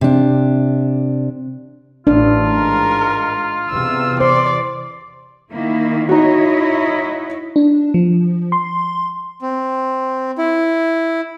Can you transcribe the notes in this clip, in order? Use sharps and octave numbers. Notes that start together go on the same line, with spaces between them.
C3 D4
A1 D4 F4
G#2 G#3 A#4
E2 C3 E6
C5 D5 C6
D#3 A#3 E4
D#4 E4 F#4 C#5 D#5
D4
F3
C6
C4
E4